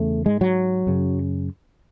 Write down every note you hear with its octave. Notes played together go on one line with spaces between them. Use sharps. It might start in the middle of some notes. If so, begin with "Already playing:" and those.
Already playing: E2 C#3 A3
G#2 G#3
F#3
F#2 C#3